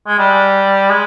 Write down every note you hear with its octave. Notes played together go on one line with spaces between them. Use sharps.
G#3
G3
G#3